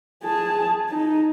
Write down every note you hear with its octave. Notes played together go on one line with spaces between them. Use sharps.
G#4 A5
D#4